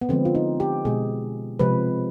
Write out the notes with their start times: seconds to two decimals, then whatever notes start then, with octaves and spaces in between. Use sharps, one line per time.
0.01 B3
0.09 D3 F3 G#3 C4
0.25 F4
0.35 D#4
0.60 G4
0.85 B2 G#3 G#4
1.59 C3 F3 G#3 B4